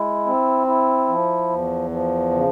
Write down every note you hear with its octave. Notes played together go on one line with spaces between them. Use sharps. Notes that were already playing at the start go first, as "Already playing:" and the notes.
Already playing: G#3 E4
C4
E4
F3
E2
F3
C#3